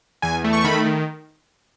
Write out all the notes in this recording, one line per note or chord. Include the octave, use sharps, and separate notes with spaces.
E2 G#5
A3
C#6
D#3 B5
D#3